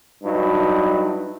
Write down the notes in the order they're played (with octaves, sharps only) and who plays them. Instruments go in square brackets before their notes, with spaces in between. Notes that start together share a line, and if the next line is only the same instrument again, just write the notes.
[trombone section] G2 F#3 D#4 E4